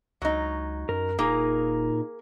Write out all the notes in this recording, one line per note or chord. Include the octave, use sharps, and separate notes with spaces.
C#2 F#3 D#4
F#2 A#4
D#1 A#2 A#3 D#4 G#4 A#4